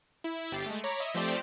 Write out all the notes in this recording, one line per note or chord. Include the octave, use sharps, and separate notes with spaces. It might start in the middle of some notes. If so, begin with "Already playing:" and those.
E4
G1 G4 A6 C7
G#3 A3
C#5 A#5 B5 D6
D#5 E5
F3 A3 C4 G4 C5 D5